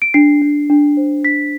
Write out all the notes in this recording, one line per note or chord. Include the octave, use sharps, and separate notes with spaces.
D7
D4 C7
D4
D4
C5
D4 B6